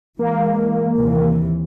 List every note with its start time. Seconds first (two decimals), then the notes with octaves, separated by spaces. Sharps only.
0.19 E3 G#3 A#3
0.98 D#2 C3 E3